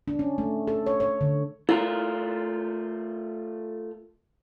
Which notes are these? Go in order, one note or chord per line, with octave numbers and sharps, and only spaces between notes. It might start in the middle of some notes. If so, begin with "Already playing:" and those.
D4
C#4
A3
A4
C#5
C#5
D3
A3 E4 F4 A#4